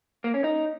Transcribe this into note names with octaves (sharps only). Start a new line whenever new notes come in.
A#3
C#4
D#4